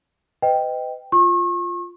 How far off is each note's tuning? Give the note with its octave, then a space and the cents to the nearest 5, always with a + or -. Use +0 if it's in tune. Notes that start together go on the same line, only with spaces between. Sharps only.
B4 +35 D#5 +0 G5 +0
F4 +0 C#6 -35